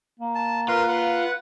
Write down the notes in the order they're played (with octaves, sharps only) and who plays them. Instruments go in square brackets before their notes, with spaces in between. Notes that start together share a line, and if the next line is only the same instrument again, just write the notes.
[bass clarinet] A#3
[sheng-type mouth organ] A5
[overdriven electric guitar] F4 [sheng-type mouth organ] A#4 B4 C6
[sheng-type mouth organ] B4 F#5